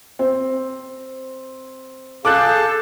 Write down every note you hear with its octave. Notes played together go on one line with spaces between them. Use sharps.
C4
G#4 A4 F5 D6 F#6 G6